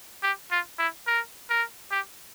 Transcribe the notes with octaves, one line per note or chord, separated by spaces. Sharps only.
G4
F4
E4
A#4
A#4
G4